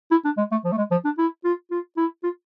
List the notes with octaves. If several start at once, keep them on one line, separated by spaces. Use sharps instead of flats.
E4
D4
G#3
A3
F3
A3
G#3
F3
D4
E4
F4
F4
E4
F4